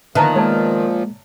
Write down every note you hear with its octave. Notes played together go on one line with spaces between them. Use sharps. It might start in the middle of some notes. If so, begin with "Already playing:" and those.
A#2 D3 D#3 F3 B3 E5 A5 A#5
G#3 A#3 C#5 D5 A5